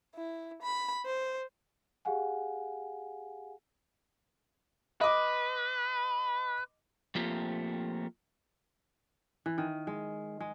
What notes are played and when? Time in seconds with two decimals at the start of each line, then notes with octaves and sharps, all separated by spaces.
0.15 E4
0.62 B5
1.06 C5
2.05 G4 G#4 F5 F#5 G#5
5.01 B4 D#5 D6
7.15 F3 A3 A#3 C4 F4 G4
9.46 E3
9.58 D#3
9.87 G#3
10.40 G#3